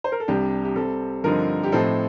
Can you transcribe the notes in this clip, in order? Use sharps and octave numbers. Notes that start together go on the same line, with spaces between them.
C5
A#4
A4
C2 C3 G3 D4 G4
G4
C3 G3 C4 A4
G2 D3 F3 C4 D#4 A#4
G4
A2 F3 C4 D#4 A4